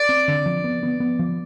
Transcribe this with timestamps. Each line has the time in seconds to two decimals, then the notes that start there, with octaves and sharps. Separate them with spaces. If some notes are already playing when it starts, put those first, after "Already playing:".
Already playing: D5
0.09 C4
0.28 D3
0.46 F3
0.64 B3
0.83 B3
1.00 B3
1.19 F3